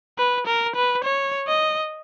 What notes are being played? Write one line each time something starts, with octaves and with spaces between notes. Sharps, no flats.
B4
A#4
B4
C#5
D#5